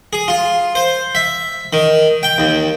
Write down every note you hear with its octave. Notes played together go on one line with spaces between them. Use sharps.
G#4
F4
C5
E5
D#3
G5
D#2